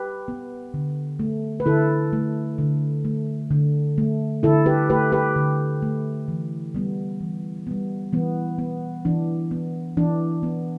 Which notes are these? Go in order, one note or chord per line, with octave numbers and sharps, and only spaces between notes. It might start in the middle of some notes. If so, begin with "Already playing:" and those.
Already playing: G4 B4
B3
D3
A3
B4
D3 E4 A4
A3
D3
A3
D3
A3
D3 E4 A4
G4 B4
A3 G4 B4
G4 B4
D3
A3
E3
G3 B3
E3
G3 B3
E3 B3
B3
E3 D4
B3
E3 D4
B3